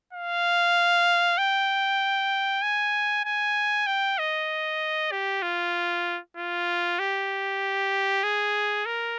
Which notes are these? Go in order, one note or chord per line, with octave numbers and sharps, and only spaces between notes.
F5
G5
G#5
G#5
G5
D#5
G4
F4
F4
G4
G#4
A#4